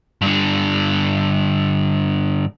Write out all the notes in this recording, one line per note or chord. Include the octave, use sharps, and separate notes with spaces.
G2 D3